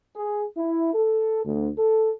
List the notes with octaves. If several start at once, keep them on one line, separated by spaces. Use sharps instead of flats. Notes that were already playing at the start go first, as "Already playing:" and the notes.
G#4
E4
A4
D2
A4